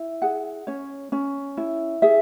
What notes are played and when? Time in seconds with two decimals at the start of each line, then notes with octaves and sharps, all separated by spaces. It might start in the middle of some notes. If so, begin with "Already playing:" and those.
Already playing: E4
0.22 G#4 F#5
0.67 C#4 C#5
1.12 C#4
1.57 E4
2.02 G#4 E5